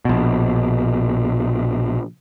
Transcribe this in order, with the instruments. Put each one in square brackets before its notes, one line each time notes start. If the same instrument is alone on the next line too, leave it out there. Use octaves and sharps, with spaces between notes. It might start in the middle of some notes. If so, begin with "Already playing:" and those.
[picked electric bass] A#1 B2